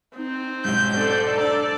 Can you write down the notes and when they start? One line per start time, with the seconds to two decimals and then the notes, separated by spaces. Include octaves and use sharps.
0.16 C4 D#4
0.65 B1 G#2 C#4 G4 G6
0.97 A4 C5 D5
1.38 D4 D5 A#5 E6